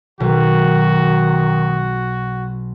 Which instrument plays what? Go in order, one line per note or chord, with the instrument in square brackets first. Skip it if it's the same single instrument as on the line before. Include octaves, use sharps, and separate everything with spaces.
[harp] B1 B2 [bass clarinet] D#3 [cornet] F#4